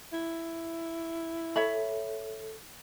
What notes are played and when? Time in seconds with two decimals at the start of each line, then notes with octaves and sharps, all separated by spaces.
0.13 E4
1.56 A4 C#5 E5 B5